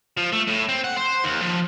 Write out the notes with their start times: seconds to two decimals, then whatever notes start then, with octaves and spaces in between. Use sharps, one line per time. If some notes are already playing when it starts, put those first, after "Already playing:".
0.17 F3
0.33 A3
0.48 A2
0.69 C4
0.84 F#5
0.97 C5
1.24 D#2
1.42 F3